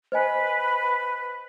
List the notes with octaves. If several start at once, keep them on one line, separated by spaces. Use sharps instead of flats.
B4 C5 D#5 G#5